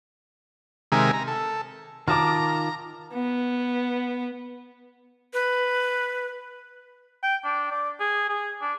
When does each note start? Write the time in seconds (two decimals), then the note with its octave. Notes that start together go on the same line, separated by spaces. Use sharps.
0.92 C3 D#3 G#3 A#4 E5 G#5
1.13 A#5
1.27 A4
2.08 D#3 F4 A5 A#5 D6 D#6 F6
3.13 B3
5.33 B4
7.23 G5
7.44 D4
7.71 D5
8.00 G#4
8.29 G#4
8.61 D4